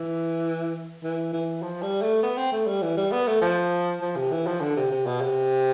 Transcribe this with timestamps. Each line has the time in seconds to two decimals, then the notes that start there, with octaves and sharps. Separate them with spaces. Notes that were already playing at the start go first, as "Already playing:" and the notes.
Already playing: E3
1.03 E3
1.33 E3
1.62 F3
1.83 G3
2.02 A3
2.23 B3
2.38 C4
2.52 A3
2.67 G3
2.82 E3
2.97 G3
3.12 B3
3.27 A3
3.41 F3
4.02 F3
4.16 C3
4.32 E3
4.47 F3
4.61 D3
4.76 C3
4.91 C3
5.07 B2
5.21 C3